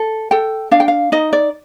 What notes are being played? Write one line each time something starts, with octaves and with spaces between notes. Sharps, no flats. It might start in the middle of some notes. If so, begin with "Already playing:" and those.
Already playing: A4
A4 G5
D4 F5
G5
F5
D#4 D#5
D5